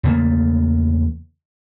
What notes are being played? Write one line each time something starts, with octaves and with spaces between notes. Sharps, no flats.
E2 C#3 A3 A#3